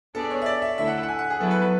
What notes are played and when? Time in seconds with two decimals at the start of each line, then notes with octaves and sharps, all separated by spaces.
0.15 B3 D4 G#4 A4 D5
0.30 C#5
0.42 E5
0.46 D5
0.62 E5
0.77 D3 A3 E4 A4 E5
0.88 F#5
1.03 F#5
1.09 G#5
1.19 F#5
1.30 G#4
1.40 F#3 B3 E4 A4
1.51 B4
1.62 B4